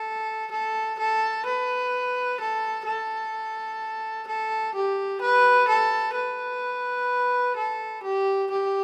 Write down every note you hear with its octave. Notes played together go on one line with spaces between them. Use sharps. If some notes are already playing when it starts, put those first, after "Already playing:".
Already playing: A4
A4
A4
B4
A4
A4
A4
G4
B4
A4
B4
A4
G4
G4